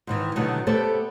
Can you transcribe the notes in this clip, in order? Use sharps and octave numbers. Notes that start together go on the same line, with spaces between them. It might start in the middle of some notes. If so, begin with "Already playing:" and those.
G#2 D#3 E3
B2 D3 D#3 F#3 G3 A3
A3 B3 G4 A4 C5 D5